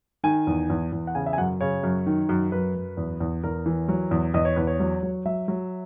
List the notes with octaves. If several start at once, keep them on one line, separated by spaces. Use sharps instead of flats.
D#3 G#5
E2
E2
E2
F#5
C#3 G#5
E5
G#5
F#2 F#5
C#3 C#5
F#2
D#3
F#2
F#2 B4
F#2
E2
E2
E2 A#4
E3
F#3
E2
E2 D#5
C#5
E2 B4
C#5
F#3
F#3
F#3 E5
F#3